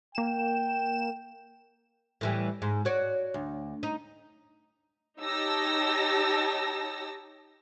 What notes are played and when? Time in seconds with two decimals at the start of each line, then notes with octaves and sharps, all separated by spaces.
0.15 A#3 G5 E7
2.21 A2 E3 G3
2.62 G#2
2.85 F#4 C#5 D5
3.34 D2
3.83 D#4
5.21 D#4 G4 C#5 A5 E6 A#6